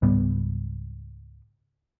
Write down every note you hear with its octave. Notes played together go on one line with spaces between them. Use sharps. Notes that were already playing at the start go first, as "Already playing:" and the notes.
C#2 G#2 G3 B3